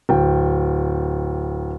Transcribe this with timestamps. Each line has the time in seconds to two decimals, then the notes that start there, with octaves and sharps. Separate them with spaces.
0.09 D1 G5